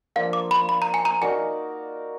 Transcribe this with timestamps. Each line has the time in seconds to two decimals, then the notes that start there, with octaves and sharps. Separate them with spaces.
0.16 F3 A#3 D4 F5
0.33 D6
0.51 B5
0.69 B5
0.82 A#5
0.94 G#5
1.05 A#5
1.21 D#4 F#4 A#4 D5 G#5